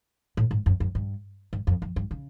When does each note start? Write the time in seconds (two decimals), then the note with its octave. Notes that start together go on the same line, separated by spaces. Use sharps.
0.37 A2
0.51 G#2
0.66 F#2
0.80 F#2
0.95 G2
1.53 G2
1.67 F2
1.82 F2
1.96 G2
2.11 C#3